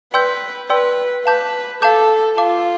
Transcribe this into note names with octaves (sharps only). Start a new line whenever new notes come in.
B4 D5 G5 C6 E6 G6
B4 D5 G5 C6 E6 G6
B4 F5 A5 D6 G6
A4 F5 A5 D6 G6
F4 F5 A5 D6